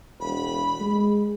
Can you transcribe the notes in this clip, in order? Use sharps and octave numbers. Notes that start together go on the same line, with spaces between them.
E1 B5
G#3